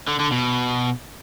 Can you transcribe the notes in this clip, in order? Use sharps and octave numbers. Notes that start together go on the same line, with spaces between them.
D3
D3
B2